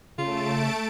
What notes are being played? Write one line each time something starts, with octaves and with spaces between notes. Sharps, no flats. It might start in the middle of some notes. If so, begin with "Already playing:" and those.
C#3 A3 F4 A5 D7